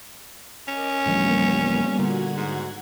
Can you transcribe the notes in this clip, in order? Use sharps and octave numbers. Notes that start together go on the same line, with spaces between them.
C#4 A#4 D#5 D6
A1 D2 F3 G3 A#3 B3
A#2 D3 F#4 F#5 G#6
G#2